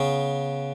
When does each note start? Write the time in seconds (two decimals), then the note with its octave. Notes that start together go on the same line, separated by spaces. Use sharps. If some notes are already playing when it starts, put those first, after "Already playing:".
Already playing: C#3 B3